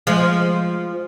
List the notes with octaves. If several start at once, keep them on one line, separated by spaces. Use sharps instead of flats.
F3 G#3